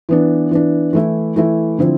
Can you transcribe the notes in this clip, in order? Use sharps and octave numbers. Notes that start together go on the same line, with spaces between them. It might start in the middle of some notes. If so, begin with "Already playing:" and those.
E3 B3 D4
E3 B3 D4
E3 A3 E4
E3 A3 E4
D3 F3 C4 E4